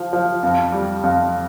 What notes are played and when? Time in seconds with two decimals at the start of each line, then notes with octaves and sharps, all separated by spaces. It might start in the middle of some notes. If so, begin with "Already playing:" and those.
Already playing: F3
0.13 F3
0.43 F2
0.72 G3
1.03 F2